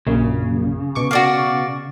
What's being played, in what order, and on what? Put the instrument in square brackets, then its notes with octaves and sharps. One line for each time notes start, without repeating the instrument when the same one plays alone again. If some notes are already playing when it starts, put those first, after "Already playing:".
[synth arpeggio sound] A#1 F#2 A#2 [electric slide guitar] C#3
[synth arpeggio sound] B2 C#6 D6
[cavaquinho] F#4 D5 F5